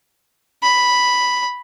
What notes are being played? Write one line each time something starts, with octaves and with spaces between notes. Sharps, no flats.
B5